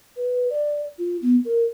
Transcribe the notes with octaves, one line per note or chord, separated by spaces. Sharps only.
B4
D5
F4
B3
A#4